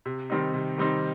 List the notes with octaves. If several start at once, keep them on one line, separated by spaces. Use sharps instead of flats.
C3
D#3 G3 C4 D#4
C3
D#3 G3 C4 D#4